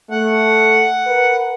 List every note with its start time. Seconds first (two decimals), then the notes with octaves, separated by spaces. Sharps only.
0.11 A3 F#5
1.07 A#4 B4